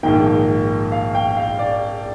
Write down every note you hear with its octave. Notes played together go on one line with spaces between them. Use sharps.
A#1 G#2 D#3 A#3 G5
F5
G5
F5
D5